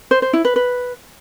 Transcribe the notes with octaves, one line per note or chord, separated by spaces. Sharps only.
C5
C5
E4
B4
B4